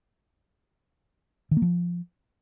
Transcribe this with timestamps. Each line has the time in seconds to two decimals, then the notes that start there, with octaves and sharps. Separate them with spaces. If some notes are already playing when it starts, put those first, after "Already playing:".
1.51 D#3
1.57 A#3
1.62 F3